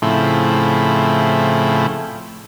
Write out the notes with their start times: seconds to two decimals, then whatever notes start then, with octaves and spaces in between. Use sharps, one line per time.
0.02 A2 C#3 F3 A3 C4 E4